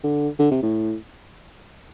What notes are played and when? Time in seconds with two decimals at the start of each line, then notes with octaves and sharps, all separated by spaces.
0.04 D3
0.39 D3
0.51 C3
0.63 A2